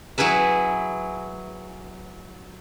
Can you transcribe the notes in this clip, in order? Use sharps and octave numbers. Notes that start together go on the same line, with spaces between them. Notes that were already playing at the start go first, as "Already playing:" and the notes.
F#3 E4 G#4 B4 E5